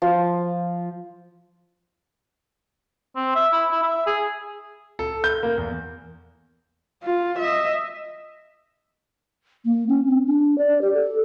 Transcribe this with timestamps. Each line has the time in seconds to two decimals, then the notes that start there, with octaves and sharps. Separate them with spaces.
0.02 F3
3.16 C4
3.35 E5
3.52 E4
3.71 E4
3.82 E5
4.07 G#4
4.99 A4
5.24 G6
5.43 A#3
5.58 E2
7.03 F4
7.38 D#5 E5
9.65 A#3
9.88 C#4
10.07 C4
10.26 D4
10.58 D5
10.81 G4
10.94 A4